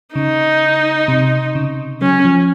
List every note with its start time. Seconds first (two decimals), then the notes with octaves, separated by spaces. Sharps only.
0.15 C#3 D#4
1.08 C3
1.55 C#3
2.01 F#3 C#4
2.25 F3